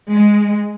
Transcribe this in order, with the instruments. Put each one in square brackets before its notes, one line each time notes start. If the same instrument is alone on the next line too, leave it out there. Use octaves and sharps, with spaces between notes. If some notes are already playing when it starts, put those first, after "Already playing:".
[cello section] G#3